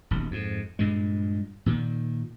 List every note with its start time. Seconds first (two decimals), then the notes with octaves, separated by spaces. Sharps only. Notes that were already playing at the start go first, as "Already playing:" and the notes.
0.11 D#1 B1
0.31 F2 G#2
0.79 G2 A#2 G#3
1.66 A#2 D#3